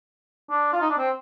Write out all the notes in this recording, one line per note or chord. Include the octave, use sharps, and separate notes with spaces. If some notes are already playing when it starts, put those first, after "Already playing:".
D4
F4
D#4
D4
C4